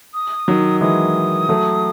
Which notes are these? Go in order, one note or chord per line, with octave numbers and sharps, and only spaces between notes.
D#6
D#3 F#3
E3 G#3 D#6
F#3 A3